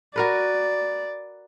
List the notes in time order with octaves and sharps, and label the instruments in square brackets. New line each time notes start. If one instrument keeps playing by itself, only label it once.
[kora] F#4 A#4 B4 [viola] D5